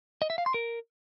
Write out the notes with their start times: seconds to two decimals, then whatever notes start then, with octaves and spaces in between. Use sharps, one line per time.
0.22 D#5
0.30 E5
0.38 F5
0.46 C6
0.54 A#4